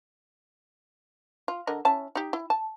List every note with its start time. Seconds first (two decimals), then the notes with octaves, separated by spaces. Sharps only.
1.48 F4
1.67 D3 A#4 D#5
1.85 C#4 E4 A5
2.15 D#4 G4
2.33 E4
2.50 A5